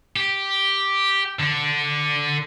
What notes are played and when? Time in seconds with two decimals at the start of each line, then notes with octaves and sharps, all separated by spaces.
0.16 G4
1.39 D3